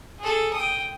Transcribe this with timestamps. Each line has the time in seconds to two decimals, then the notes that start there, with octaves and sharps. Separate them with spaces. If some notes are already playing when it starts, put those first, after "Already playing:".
0.19 G#4 A4
0.53 G5 D#6